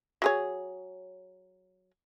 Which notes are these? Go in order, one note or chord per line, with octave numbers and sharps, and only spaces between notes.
F#3 G#4 C#5